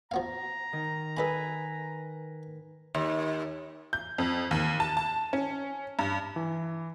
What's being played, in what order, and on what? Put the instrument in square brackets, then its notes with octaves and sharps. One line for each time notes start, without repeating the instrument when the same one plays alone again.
[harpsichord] F3 B3 F5 [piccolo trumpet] A#5
[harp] D#3
[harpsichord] A4 D#5 B5 [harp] B4 G#5
[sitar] D#2
[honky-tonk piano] G6
F2
D#2
A5
A5
C#4
G2
[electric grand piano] E3